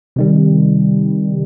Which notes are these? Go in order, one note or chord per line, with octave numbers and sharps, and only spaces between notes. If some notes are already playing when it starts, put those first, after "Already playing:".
C3 D#3 G3